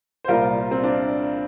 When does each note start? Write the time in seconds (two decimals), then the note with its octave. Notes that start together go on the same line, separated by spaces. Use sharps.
0.24 C5
0.28 C2 A#2 G3 F4 A#4
0.71 C4
0.84 D4